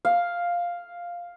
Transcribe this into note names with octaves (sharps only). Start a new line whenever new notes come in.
F5